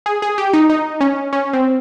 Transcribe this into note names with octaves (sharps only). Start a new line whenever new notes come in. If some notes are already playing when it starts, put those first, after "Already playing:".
G#4
G#4
G4
D#4
D#4
C#4
C#4
C4